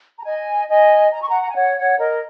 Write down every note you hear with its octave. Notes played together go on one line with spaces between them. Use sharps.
A#5
D#5 G#5
D#5 G#5
A#5
C#6
F#5 A#5
A#5
G#5
C#5 F#5
C#5 F#5
A#4 D#5